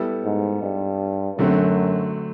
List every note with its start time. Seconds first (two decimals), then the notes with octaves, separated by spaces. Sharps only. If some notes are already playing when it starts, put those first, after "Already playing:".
Already playing: G3 B3 E4 A4
0.24 G#2
0.63 G2
1.38 F#2 D3 F#3 A3 C4